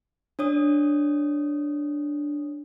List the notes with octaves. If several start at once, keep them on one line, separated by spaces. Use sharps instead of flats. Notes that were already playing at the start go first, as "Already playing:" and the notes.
D4 C#5 D#6